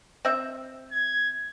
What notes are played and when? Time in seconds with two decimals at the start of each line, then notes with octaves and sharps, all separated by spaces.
0.25 C4 E5
0.92 G#6